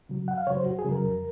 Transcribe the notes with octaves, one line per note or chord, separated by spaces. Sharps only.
C#3 F#3
F#2 F#5
F5
C#3 F#3 C#5
C5
F#2 F#4
G#4
C#3 F#3
A#4
F2